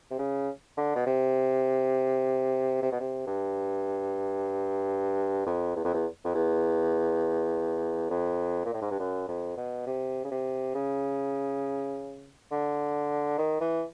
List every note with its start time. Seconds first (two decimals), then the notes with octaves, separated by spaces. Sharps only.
0.11 C3
0.19 C#3
0.77 D3
0.96 B2
1.06 C3
2.82 C3
2.92 B2
3.00 C3
3.27 G2
5.47 F2
5.76 E2
5.85 F2
5.94 E2
6.25 F2
6.34 E2
8.10 F2
8.65 A#2
8.74 A2
8.82 G#2
8.91 G2
8.99 F#2
9.28 F2
9.57 B2
9.86 C3
10.25 C#3
10.31 C3
10.75 C#3
12.51 D3
13.38 D#3
13.61 E3